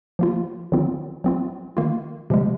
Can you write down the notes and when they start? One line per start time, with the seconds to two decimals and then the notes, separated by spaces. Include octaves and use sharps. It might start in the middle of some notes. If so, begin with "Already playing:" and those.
0.19 F3 A#3 F4
0.72 D#3 F#3 C4 F4
1.24 F#3 C4 F4
1.77 D#3 A#3 F4
2.30 C3 F3 G#3